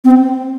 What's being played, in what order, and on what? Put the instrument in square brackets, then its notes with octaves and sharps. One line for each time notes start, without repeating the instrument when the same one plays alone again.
[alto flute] C4